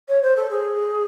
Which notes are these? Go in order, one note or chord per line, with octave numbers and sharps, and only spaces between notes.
C#5
C5
A4
G#4